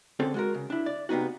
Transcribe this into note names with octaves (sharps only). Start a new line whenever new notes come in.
D3 C4 C#4 G#4 A4
G#3 F#4 A#4
C#3
D4 E4
D5
C3 A#3 B3 D#4 F#4